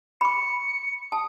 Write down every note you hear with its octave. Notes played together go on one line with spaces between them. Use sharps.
B5 C#6 C#7
A5 D#6